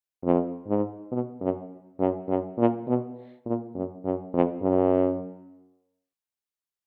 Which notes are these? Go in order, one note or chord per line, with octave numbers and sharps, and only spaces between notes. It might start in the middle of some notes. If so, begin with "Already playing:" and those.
F2
G#2
B2
F#2
F#2
F#2
A#2
B2
A#2
F#2
F#2
F2
F#2